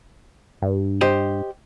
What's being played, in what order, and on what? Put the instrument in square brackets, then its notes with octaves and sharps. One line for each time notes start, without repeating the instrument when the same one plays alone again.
[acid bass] G2
[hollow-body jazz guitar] G4 C5 D#5